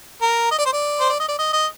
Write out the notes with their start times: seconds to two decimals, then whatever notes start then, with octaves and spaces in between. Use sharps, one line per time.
0.22 A#4
0.51 D#5
0.58 D5
0.66 C5
0.73 D5
1.00 C5
1.09 D5
1.20 D#5
1.28 D5
1.39 D#5
1.53 D#5